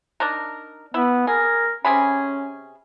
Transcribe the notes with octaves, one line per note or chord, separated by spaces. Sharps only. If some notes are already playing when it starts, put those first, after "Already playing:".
D4 D#4 A#4
B3 E4
G#4 A#4
C3 C#4 G#4 B5